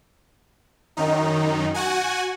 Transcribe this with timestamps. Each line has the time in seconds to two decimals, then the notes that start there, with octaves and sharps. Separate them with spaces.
0.97 F#2 D#3 D#4
1.74 F#4 F#5 G#5